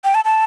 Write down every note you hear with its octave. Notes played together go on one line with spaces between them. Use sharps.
G5
A5
A5